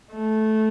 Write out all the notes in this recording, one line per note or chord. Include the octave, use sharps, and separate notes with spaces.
A3